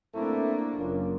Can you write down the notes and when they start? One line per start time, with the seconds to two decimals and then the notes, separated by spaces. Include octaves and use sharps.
0.15 A3 A#3 C4 D4 E4
0.78 F#1 A#3 C#4 F4